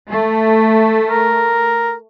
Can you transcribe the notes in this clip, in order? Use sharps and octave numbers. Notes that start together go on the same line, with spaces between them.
A3
A#4